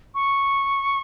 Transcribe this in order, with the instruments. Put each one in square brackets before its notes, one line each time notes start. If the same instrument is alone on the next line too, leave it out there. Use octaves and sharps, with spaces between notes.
[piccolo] C#6